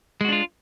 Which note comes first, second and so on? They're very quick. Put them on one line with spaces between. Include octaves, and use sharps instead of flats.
G#3 F#4 D4 F4